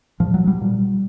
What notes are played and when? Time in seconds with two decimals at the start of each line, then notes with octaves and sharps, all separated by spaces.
0.20 A#2 F3
0.34 F#3
0.47 G3
0.61 A#2